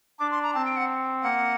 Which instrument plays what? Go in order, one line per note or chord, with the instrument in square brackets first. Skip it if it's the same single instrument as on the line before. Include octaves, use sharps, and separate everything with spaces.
[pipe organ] D4 [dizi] D6
[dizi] C6
A#5
[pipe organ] C4 [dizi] A5
[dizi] G5
F#5
[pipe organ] A#3 [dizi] F#5